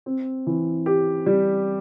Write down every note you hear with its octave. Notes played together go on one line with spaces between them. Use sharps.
C4
E3
G4
G3